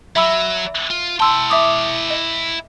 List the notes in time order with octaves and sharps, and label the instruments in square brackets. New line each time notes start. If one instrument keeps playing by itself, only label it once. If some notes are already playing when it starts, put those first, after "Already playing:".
[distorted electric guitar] F#3 [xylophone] E5 B5 E6
[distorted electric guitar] F4
[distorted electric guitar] E4 G5 [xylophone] A5 C6 E6
[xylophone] E5 D6 D#6
D#5